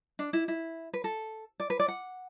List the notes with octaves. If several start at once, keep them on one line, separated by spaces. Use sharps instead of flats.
D4
E4
E4
B4
A4
D5
B4
D5
F#5